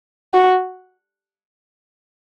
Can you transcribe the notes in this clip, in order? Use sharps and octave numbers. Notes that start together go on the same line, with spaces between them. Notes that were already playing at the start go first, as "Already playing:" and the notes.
F#4